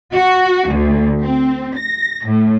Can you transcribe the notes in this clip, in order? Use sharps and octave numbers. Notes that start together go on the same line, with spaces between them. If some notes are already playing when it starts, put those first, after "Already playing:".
F#4
D2
C4
A#6
A2